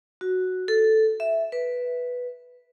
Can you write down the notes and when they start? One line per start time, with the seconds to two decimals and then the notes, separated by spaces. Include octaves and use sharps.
0.21 F#4
0.68 A4
1.20 E5
1.52 B4